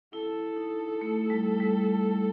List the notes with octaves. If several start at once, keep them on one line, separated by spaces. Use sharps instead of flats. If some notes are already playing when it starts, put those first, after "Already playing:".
E4 A4
D#4
A3
G3
G3